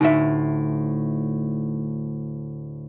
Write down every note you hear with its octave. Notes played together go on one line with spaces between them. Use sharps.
D2 A2 D#4 E5